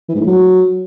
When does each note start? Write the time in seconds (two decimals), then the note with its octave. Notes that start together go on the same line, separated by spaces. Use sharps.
0.09 E3
0.15 G#2
0.21 A2
0.27 F#3